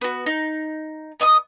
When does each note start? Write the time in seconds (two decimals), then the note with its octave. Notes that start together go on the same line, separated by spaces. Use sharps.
0.01 B3 F#4
0.26 D#4
1.20 B3 D#5 D6 D#6